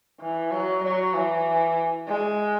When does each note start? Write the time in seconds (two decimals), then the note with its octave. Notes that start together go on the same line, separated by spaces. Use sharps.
0.20 E3
0.51 F#3
0.83 F#3
1.14 E3
2.07 G#3